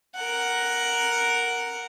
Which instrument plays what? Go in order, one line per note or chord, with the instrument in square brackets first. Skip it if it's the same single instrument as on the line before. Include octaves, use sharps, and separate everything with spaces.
[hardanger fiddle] A#4 F#5